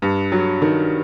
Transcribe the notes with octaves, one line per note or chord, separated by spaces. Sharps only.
G2
F#3
D#3